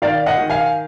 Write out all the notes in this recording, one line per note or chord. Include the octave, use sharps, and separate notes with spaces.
D#3 D5 F5
D#5 F#5
D#3
F5 G#5